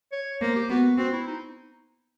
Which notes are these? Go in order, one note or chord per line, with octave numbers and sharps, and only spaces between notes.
C#5
A#3 C5
G4
B3 F#4
C4 F#4
E4
D#4